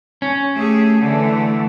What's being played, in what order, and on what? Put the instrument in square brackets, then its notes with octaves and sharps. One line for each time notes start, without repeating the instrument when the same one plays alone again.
[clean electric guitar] C#4
[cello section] A3 G4 G#4
D3 E3 A3